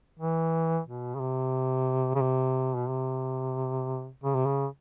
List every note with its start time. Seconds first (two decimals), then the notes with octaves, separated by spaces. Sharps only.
0.19 E3
0.86 B2
1.15 C#3
1.20 C3
2.15 C#3
2.21 C3
2.75 B2
2.89 C3
4.23 C#3
4.35 C3
4.46 C#3